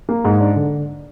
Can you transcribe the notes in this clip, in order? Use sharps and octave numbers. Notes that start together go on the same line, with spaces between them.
A#3
G#2
D4
D3